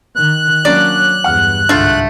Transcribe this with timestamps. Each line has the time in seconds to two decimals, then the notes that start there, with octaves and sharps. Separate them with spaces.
0.16 D#3 F#6
0.65 F#3 A#3 C#4 D4 D5
1.24 E2 G2 F#5 F6
1.69 C2 G#2 D3 A3 F4